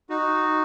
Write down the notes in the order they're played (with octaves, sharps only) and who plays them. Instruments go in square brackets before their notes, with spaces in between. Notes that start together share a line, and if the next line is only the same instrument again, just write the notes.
[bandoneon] D#4 F#4